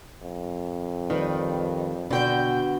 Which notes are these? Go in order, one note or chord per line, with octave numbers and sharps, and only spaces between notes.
F2
D#3 G3 B4
B2 D3 B3 F#4 G5 G6